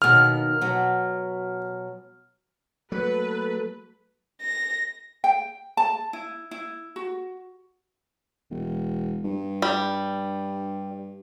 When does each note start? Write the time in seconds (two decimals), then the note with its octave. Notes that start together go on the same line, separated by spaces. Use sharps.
0.02 D#2 B2 D#3 F6
0.61 B2 F#3
2.92 F#3 A3 A#3 A4 B4
4.42 A#6
5.24 G5
5.77 A5
6.13 E4
6.51 E4
6.96 F#4
8.51 E1
9.24 G2
9.62 G3